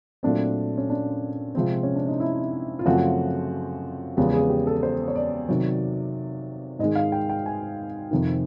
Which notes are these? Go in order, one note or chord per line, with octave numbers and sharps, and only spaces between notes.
A#2 F#3 A3 C4 D4
C#4
D4
C3 F3 G#3 C4
C#4
D4
D#4
E4
F4
F#2 C#3 F3 A3 C4 F#4
E2 C#3 F3 G#3 B3 G4
G#4
G4
A4
C5
C#5
D5
C3 D#3 F#3
G#2 D#3 G#3 D#5
F5
G5
G5
G#5
F2 C3 D#3